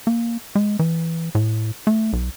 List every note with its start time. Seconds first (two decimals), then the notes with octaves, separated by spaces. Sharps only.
0.07 A#3
0.55 G#3
0.79 E3
1.35 A2
1.87 A3
2.13 B1